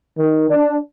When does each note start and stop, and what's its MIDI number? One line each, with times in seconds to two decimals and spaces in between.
0.17 0.48 51
0.49 0.75 62